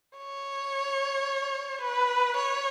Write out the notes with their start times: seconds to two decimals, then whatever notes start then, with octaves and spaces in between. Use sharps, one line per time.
0.18 C#5
1.82 B4
2.37 C#5